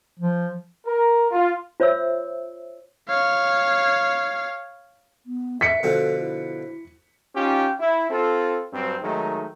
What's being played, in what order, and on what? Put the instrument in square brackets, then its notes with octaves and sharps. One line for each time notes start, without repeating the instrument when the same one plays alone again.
[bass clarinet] F3
[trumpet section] A#4
F4
[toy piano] F4 C5 C#5 E5 E6
[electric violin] C#5 F5
[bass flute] B3
[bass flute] E5 [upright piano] B6 C#7
[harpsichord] B2 D3 F3 [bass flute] A4
[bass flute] E4
[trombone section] C#4 D#4 F4 G4
E4
C4 F4 A4
G2 F#3 C4
D#3 F#3 G#3 A3 D#4